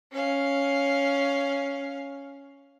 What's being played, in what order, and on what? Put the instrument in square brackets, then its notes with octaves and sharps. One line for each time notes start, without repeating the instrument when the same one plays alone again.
[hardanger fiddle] C#4 F5